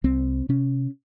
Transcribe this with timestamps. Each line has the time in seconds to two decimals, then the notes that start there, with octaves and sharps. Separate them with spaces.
0.04 C2 C4
0.49 C3 C#4